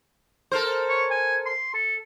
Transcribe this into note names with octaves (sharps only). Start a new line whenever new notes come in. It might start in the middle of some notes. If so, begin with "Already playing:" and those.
A4 A#4 C5
C#5
G#5
C6
A4